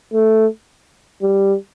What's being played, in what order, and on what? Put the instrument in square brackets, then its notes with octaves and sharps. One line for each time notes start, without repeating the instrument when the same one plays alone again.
[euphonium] A3
G3